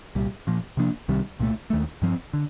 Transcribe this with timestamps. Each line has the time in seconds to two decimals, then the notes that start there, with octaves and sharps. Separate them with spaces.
0.15 C2 A#2 G3
0.47 A#2 F3 A#3
0.77 C3 F3 A#3 D4
1.08 C2 C3 D#3 G3
1.39 C2 A#2 F3 A3
1.70 D#2 D#3 A3
2.02 G2 F3 A3 C4
2.33 D3